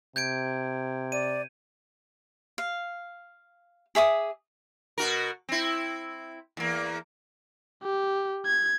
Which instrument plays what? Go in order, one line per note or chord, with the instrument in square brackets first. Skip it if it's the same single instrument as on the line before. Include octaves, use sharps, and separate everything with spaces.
[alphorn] C3 [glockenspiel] G6 G#6 D7
[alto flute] D5 [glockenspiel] D#7
[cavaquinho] F5
G#4 E5 D6 D#6
[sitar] B2 F#4 A#4
C4 E4
E2 A#3
[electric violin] G4
G#6